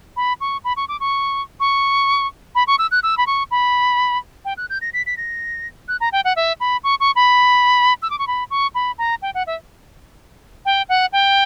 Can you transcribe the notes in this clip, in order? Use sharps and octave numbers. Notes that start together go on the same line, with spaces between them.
B5
C#6
B5
C#6
D6
C#6
C#6
B5
C#6
E6
F#6
E6
B5
C#6
B5
G5
F#6
G6
A#6
B6
B6
A#6
F#6
A#5
G5
F#5
E5
B5
C#6
C#6
B5
E6
D6
C#6
B5
C#6
B5
A#5
G5
F#5
E5
G5
F#5
G5